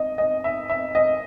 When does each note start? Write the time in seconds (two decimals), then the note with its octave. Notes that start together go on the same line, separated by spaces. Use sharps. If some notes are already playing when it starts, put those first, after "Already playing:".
Already playing: D#5
0.18 D#5
0.44 E5
0.70 E5
0.95 D#5